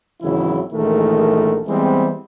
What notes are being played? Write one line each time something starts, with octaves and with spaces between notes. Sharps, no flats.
G#1 C#3 E3 F#3 E4
A#1 D#3 E3 G#3 A3 A#4
E3 G3 G#3 B3 C4